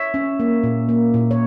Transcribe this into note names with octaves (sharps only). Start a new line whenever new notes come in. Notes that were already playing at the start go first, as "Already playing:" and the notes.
Already playing: C#5 E5
C#4
A#3
A#2
A#3
A#2
C#5